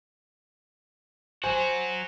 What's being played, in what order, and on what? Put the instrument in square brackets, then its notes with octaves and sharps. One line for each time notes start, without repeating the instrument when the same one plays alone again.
[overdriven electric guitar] F#3 F#4 [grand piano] C5 G#5